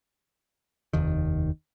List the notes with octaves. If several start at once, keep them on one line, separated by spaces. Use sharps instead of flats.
F1 D#2 D#3